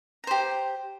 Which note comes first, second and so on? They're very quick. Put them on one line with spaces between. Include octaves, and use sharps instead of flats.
A#5 C5 G4